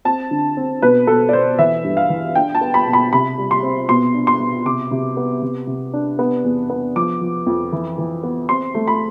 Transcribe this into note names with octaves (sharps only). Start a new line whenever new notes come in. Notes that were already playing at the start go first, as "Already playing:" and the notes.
C4 A5
D3
C4
B2 B4
B2 A4
D5
B2 C5
E3 E5
G2
F5
E3
D4 G5
A5
B3
B5
B2
B5
C3 B5
G3
C6
C4
B2 C6
D4
C6
B2
C3 D6
C3
B3
C3
C3
D4
B3
E2
B3
F3 D6
F3
F2
E3
E3
B3
C4 C6
A3
B5